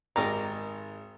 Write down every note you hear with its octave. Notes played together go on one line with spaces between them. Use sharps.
G#1 D#3 G4 A#4 D#5 A#5